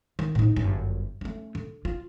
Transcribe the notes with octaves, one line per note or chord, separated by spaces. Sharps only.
D#3
A2 D#4
G1 F#2
A3 C#4
D3
F4